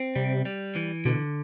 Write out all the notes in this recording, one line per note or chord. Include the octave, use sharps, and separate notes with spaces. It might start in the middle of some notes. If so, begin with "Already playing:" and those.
Already playing: C4
C3 G3
G3
E3
B2 D3